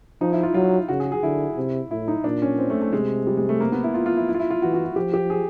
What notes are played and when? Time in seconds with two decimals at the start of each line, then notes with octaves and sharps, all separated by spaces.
0.21 F3 D#4
0.33 E4
0.43 F4
0.54 F#3 F4
0.88 C#3 F#4
1.00 G#4
1.12 G#4
1.23 D3 E4
1.57 C3
1.91 A2 E4
2.08 D#4
2.24 A#2 D4
2.42 C#4
2.59 C4
2.70 A3
2.82 A3
2.92 C3 G#3
3.27 G3
3.37 G#3
3.49 A3
3.61 A#3
3.72 B3
3.84 E4
3.94 F4
4.06 F4
4.17 E4
4.29 E4
4.35 F4
4.39 E4
4.50 F4
4.62 E3 F#4
4.74 F#4
4.85 F#4
4.96 F3 G4
5.14 G4
5.30 G#4